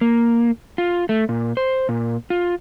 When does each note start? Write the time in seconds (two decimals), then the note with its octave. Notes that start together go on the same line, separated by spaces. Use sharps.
0.01 A#3
0.78 F4
1.09 A3
1.29 A#2
1.57 C5
1.89 A#2
2.30 F4